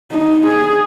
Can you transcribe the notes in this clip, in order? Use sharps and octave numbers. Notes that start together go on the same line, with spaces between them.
D#4
G#4